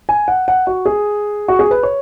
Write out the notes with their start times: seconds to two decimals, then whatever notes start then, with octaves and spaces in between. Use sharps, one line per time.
0.09 G#5
0.28 F#5
0.48 F#5
0.67 F#4
0.86 G#4
1.48 F#4
1.59 G#4
1.71 B4
1.83 C#5